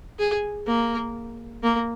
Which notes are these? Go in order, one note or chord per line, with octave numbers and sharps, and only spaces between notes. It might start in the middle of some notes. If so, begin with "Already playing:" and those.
G#4
A#3
A#3